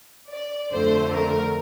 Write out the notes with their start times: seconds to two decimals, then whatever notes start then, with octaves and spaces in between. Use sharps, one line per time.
0.30 D5
0.71 F2 D3 A3 C5
1.12 A#4